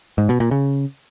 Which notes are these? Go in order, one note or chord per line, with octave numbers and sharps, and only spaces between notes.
G#2
B2
A#2
C#3